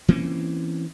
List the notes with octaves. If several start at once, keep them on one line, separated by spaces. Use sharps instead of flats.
E3 A#3 C4 C#4